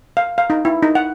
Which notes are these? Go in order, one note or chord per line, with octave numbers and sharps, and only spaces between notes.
F5
F5
D#4
E4
D#4
F#5